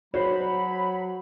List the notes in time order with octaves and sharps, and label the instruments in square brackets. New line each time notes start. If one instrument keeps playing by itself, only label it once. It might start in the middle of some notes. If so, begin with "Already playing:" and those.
[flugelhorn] F#3 [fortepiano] F#4 C5 [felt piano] C#5 [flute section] B5